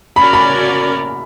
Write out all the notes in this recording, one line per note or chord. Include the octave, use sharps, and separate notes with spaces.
C#4 F#4 A#4 D5 B5
B5